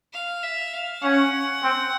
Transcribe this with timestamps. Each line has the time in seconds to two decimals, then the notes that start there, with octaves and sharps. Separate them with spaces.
0.13 F5
0.43 E5
0.73 F5
1.02 C#4 F#5
1.62 C4